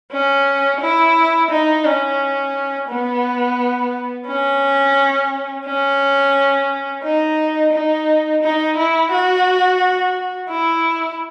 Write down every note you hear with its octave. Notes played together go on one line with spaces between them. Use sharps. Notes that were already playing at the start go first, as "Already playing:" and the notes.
C#4
E4
D#4
C#4
B3
C#4
C#4
D#4
D#4
D#4
E4
F#4
E4